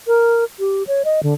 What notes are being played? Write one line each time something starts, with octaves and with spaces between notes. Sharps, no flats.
A#4
G4
C#5
D#5
D3